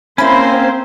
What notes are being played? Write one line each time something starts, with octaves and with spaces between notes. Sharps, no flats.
A#3 C4 C#4 E4 C5 B5